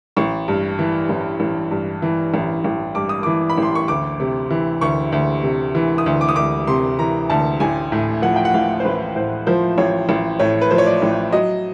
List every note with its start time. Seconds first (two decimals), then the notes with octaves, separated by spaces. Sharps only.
0.17 A1 C#6
0.48 G2
0.79 E3
1.09 A1
1.40 A1
1.71 G2
2.02 E3
2.34 A1
2.64 A1
2.95 G2 D6
3.09 D#6
3.23 E3 D6
3.50 B5
3.57 A1 C6
3.75 C#6
3.88 D2 D6
4.20 C3
4.50 E3
4.81 D2 C#6
5.12 D2
5.43 C3
5.75 E3
5.98 D#6
6.06 D2
6.21 D6
6.29 D#6
6.36 D2 D6
6.67 C3 C6
6.99 E3 A#5
7.30 D2 A5
7.60 A1 G#5
7.92 A2
8.22 F3 F#5
8.36 G5
8.45 F#5
8.54 A1 F5
8.80 C5
8.85 A1 B4
9.16 A2 C5
9.47 F3 C5
9.78 A1 C#5
10.09 A1
10.39 A2 C#5
10.61 B4
10.70 F3 C5
10.78 C#5
10.86 D5
11.02 A1
11.32 F#3 D#5